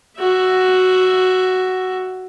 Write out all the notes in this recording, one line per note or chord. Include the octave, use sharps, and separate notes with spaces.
F#4 E5